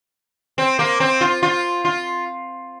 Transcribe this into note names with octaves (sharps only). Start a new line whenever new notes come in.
C4
A#3
C4
F4
F4
F4